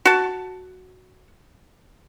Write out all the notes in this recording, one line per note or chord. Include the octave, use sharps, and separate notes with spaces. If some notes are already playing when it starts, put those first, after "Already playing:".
F#4 A5